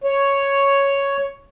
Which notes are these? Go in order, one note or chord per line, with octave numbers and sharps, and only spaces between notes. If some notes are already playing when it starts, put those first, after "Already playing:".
C#5